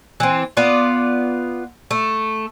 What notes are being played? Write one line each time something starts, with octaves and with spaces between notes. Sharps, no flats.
E3 C4
B3 F4 D5
A3